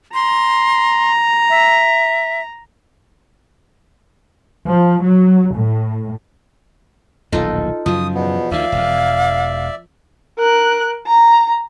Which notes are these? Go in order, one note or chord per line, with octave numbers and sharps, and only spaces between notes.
A#5 C6
E5
F3
F#3
A2
D#1 B1 E2 D#4 F4 A4
F#2 C#3 F3 F#3 D#6
E2 B2 B3
D2 D#3 D5 E5 F5
E1 E2
A#4 F#6
A#5